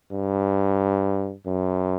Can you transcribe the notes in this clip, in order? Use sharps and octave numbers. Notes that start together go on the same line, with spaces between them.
G2
F#2